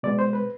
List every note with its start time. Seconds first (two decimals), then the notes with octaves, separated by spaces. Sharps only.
0.03 B2 G#3 B3 D5
0.19 C5
0.33 B4